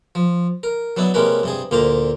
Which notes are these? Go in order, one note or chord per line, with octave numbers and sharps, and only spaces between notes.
F3
A#4
F#3 B3 D4 E4
C3 G#3 A#3 C#4 A#4 B4
G2 C3 G#4
D2 A#2 A#3 C5 A#5 D6